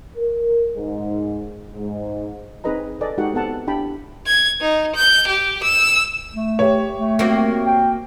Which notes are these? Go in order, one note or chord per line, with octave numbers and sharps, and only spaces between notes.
A#4
G#2
G#2
C4 D#4 G#4 B4 D#5 A#5
A4 B4 D5 D#5 G#5
G#3 D#4 F#4 G4 A4 F#5
B3 C4 A4 F#5 A5
D4 E4 G4 G5 A5 B5
G#6
D#4
G6
G4
E6
A3
G4 C#5
A3
A#3 C4 F#4
G5